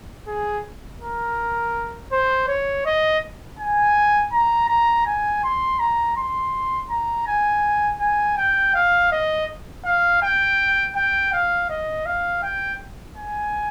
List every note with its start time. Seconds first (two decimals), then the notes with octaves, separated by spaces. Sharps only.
0.27 G#4
1.01 A#4
2.12 C5
2.48 C#5
2.86 D#5
3.59 G#5
4.33 A#5
4.69 A#5
5.06 G#5
5.44 C6
5.79 A#5
6.17 C6
6.90 A#5
7.27 G#5
8.01 G#5
8.37 G5
8.75 F5
9.12 D#5
9.85 F5
10.22 G5
10.96 G5
11.33 F5
11.70 D#5
12.06 F5
12.43 G5
13.16 G#5